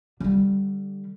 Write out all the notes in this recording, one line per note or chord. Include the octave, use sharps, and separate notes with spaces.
D3 G3